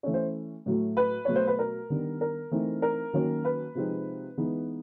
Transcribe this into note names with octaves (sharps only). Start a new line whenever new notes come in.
E3 A3 C#4 C#5
C5
A2 F#3 A3
B4
B2 F#3 A3 C#5
C5
B4
A#4
D#3 G3 B3 D4
A#4
E3 A3 C4 D#4
A#4
D#3 F#3 A#3 C#4
B4
C3 F3 G#3 C4 D#4
E3 G#3 B3 D#4